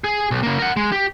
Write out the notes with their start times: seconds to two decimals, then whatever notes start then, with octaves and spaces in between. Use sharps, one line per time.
0.04 G#4
0.31 B1
0.43 C#3 A#3
0.58 A#4 F#5
0.76 G#3
0.92 G4